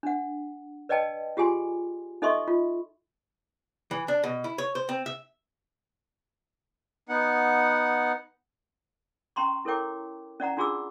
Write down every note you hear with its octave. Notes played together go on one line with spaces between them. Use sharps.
D4 F#5
B4 D5 D#5 G5 A5
F4 G4 G#4 G#5 C6
D#4 A4 D#5 E5 C6 C#6
F4
E3
D4
B2
E4
C#5
C5
C4
E5
B3 D#4 F#5
C#4 G5 A#5 C6 C#6
E4 A4 A#4 C#5 G5 D6
C#4 D5 F#5 A#5
D4 F4 F#4 G#4 D6 E6